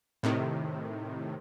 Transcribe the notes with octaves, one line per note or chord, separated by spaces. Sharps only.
A2 C3 D#3